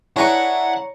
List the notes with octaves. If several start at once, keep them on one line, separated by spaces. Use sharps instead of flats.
D4 E4 G#4 B4 C#5 F#5 A#5 C#6